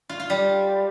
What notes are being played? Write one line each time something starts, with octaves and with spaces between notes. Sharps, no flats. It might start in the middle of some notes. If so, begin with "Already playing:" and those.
F4
F4
G3